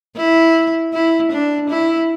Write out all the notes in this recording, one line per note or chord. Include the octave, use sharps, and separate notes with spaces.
E4
E4
D4
E4